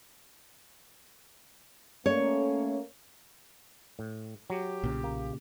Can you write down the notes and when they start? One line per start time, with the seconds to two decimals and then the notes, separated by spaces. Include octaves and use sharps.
2.06 A3 A#3 C#4 C#5
3.99 A2
4.50 F#3 G4
4.84 B1 A#2 C#3
5.04 A#3